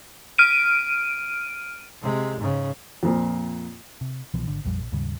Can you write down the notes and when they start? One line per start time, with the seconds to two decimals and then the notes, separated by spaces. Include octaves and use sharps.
0.38 F6 D7 D#7
2.02 C3 G#3
2.40 G#2 C#3
3.03 F2 A#2 F3
4.01 C3
4.34 C2 B2 E3 F3
4.47 G#1 D3
4.65 A#1 F2 G3
4.79 A#1
4.92 D#2 G#2 C#3 G3